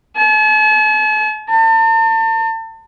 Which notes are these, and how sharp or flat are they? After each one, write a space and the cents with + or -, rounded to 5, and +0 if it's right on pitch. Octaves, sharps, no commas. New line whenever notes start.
A5 -45
A5 +40